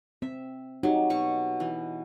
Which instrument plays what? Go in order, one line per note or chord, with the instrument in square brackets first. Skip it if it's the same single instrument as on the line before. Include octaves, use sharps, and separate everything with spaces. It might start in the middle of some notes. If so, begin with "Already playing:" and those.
[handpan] C4 [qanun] E5
[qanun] F#3 [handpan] D#4 G4
[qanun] B2 C#6
E3